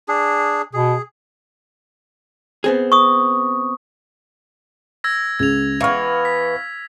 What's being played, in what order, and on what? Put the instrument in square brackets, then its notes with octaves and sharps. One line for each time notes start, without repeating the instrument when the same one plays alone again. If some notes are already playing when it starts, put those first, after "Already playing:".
[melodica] D4 G#4
[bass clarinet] B2 [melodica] G#4
[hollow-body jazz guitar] B3 C4 G#4
[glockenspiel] C#6 D#6
[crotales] E6 G#6 A#6
[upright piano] C#2 [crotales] G#6 F7
[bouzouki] E3 B3 [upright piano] F5 C#6 F6
[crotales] B6